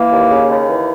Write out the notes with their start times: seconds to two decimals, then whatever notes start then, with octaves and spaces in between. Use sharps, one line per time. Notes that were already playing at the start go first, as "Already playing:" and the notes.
Already playing: E3 A#3
0.11 D#2
0.30 C#3
0.49 D#2
0.67 E3